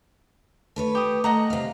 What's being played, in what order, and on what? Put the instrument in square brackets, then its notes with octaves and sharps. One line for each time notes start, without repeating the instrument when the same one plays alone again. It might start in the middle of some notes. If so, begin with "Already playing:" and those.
[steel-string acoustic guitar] A3 B4 C#5
[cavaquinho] G4 D#6
[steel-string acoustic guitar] A3 [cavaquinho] D#5 F#5 A#5
[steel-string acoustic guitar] C3 F5